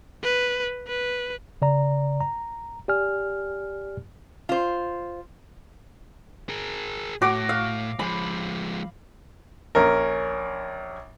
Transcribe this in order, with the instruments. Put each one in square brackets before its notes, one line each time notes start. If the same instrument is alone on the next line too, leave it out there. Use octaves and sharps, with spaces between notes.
[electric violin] B4
B4
[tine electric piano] C#3 D5 A#5
A#5
G4 D5 G#5 F6
[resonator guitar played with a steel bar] F4 C5
[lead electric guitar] G#4 A#4
[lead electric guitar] A2 [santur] F#4 D6
[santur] F5
[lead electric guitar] F3 G#3 [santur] B5
[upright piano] A#1 C#4 A#4